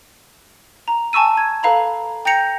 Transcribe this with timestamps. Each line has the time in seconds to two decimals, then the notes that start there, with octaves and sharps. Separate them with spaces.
0.88 A#5
1.13 G#5 A5 C#6 E6 D#7
1.37 G#6
1.63 A4 B4 F5 A#5 B5
2.25 G5 A#5 G6 A#6 C#7 F7